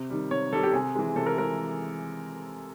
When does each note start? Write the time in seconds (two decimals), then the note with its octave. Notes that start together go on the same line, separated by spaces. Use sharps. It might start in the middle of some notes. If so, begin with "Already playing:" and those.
Already playing: C3
0.10 D#3 G3
0.31 C3 C#5
0.53 D#3 G3 A4
0.63 G4
0.73 C3 G#4
0.95 E3 G#3
1.16 C3 A4
1.26 A#4
1.38 E3 G#3 A#4